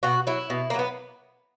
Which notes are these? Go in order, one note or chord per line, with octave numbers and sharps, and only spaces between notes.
B2 F#4
F#3 E4
B2
A#3
F#3
B3